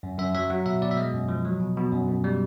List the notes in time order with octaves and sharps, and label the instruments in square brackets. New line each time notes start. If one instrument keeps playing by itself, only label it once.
[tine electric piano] F#2
F#2 E5
F#3 E5
F#3 F#5
B2 E5
B2 D5
E5
G#3 D#5
F#2
F3
F#3
B2
B2
F#2
F#2
G3